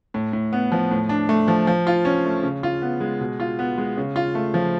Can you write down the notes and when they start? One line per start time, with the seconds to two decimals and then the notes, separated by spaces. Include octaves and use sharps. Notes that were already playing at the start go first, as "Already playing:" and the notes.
0.14 A2
0.33 A2
0.53 B3
0.72 F3
0.91 A2
1.09 D4
1.29 A3
1.48 F3
1.67 F3
1.87 F4
2.05 C#4
2.25 A3
2.43 C#3
2.63 F4
2.82 B3
3.00 G#3
3.21 B2
3.40 F4
3.59 B3
3.78 G#3
3.97 C#3
4.16 F4
4.35 A3
4.54 F3